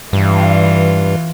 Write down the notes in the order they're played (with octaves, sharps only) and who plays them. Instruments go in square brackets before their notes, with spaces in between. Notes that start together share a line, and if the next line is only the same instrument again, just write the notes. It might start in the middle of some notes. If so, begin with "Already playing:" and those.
[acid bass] G2 [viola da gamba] E3 F4